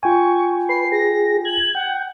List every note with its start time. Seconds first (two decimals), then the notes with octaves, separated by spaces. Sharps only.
0.03 F4 G5 G#5 C#6
0.69 B4 C7
0.92 G#4 A#6
1.45 G#6 F#7
1.75 F#5 G5